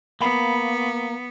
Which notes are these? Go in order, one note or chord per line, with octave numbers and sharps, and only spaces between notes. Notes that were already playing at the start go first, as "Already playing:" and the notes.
A#3 B3 F5 B5